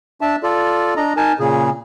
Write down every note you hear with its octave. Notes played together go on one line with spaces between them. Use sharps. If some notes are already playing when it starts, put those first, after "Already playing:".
D4 E5 A5
F4 A4 D5
D4 D#5 A#5
D#4 A#4 G#5 A5
A#2 C#3 G#4